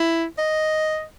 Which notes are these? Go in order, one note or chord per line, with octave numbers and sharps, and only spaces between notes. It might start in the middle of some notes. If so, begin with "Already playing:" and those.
Already playing: E4
D#5